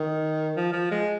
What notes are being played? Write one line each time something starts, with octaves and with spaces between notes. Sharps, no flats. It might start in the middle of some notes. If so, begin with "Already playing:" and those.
Already playing: D#3
F3
F3
G#3